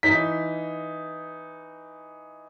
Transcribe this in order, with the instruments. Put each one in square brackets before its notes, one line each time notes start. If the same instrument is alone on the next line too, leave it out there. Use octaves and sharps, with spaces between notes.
[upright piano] E3 D#4 B6